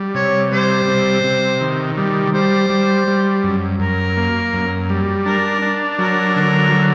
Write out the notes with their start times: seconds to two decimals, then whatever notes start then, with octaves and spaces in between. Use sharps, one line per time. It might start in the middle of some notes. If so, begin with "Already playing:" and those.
Already playing: G3
0.14 C3 C#5
0.51 G3 C5
0.88 C3
1.24 C3
1.61 D#3
1.97 G3
2.34 G3 C5
2.70 G3
3.08 G3
3.44 F#2
3.80 F#2 A#4
4.17 A#3
4.53 F#2
4.89 G3
5.26 D4 A#4
5.62 D4
5.99 F#3 A#4
6.36 D3
6.72 F#3